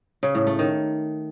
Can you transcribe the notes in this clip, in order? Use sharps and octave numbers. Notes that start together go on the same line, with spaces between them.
C#3
A2
A3
D#3